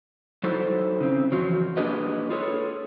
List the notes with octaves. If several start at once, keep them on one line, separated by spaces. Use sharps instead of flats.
F#3 D#4 E4 A4 C5
C#3 C4
E2 F3 F#3
A#3 D4 G4 G#4 B4 D#5
F4 G#4 A4 B4 C#5